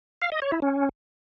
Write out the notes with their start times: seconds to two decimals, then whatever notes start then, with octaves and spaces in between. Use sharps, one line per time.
0.22 F5
0.32 D#5
0.42 C#5
0.52 E4
0.62 C#4